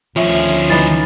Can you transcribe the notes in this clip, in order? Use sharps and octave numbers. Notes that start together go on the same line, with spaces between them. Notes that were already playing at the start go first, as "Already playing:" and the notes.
D2 D3 D#3 F3 C#4 F4 G#4 E5
E3 D#4 B4 A6 C7